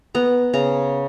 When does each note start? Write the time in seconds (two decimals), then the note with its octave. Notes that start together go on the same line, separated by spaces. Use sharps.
0.15 B3 A#5
0.53 C#3 A#5